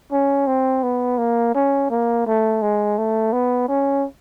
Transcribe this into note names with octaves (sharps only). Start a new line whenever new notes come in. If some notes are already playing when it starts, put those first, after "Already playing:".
C#4
C4
B3
A#3
C#4
A#3
A3
G#3
A3
B3
C#4